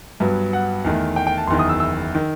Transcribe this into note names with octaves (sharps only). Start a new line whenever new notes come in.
G2 F#3 B3
F#5
E2 D#3 A3
G5
G5
A5
F#1 E2 D#3 C6
D#6
E6
E6
D#3